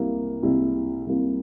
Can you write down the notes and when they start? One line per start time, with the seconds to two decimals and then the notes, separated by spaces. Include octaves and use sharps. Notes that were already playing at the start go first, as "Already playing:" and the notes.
Already playing: C2 C3 G3 A#3 E4
0.42 C2 C3 G3 A#3 E4
1.06 C2 C3 G3 A#3 E4